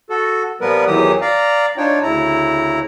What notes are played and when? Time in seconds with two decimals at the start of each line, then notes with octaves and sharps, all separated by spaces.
0.10 F#4 A4
0.61 A#2 F3 G3 B3 A#4 B4
0.87 E2 D#3 E3 F#3 G4 D#6
1.22 D5 F5 A#5
1.78 D4 D#4 F4 C#5 G5
2.03 D2 C#3 E4 A#5